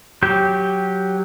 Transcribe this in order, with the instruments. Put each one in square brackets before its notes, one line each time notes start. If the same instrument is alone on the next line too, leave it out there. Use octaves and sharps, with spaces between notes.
[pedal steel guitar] F#3 G4 G5